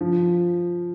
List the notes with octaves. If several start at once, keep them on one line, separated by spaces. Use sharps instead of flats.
F3